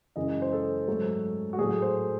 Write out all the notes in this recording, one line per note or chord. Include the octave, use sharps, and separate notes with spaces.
F#2 C#3 E3 G#3 D#5
C5
A4
G#2 F#3 A3
F#4
A2 F#3 A3 G#4
C5